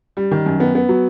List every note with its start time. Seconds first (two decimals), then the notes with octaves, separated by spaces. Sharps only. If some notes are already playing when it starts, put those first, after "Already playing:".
0.17 G3
0.31 D#3
0.46 F#2
0.60 B3
0.75 B3
0.89 F#3